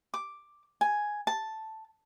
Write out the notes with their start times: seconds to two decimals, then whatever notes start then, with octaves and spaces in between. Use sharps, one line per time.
0.14 D6
0.81 G#5
1.27 A5